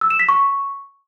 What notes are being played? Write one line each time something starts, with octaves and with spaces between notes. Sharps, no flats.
E6
E7
B6
C#6